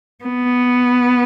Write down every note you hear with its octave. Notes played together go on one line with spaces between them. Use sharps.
B3